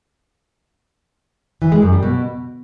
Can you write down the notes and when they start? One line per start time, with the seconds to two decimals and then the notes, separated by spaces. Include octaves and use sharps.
1.62 E3
1.72 G#3
1.82 F#2
1.92 G3
2.03 B2